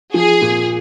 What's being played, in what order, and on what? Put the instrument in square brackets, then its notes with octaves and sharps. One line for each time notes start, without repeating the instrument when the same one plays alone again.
[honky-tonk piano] F3 [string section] G#4
[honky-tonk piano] A#2